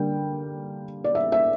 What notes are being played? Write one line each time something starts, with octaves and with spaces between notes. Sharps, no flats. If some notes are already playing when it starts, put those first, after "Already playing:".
Already playing: D3 G3 A#3 G5
D5
E5
E5